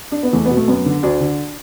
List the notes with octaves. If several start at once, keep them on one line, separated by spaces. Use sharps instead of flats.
D4
B3
E2 A3
B3
B2
A3
F#2 B3
D3
D2 D4
D3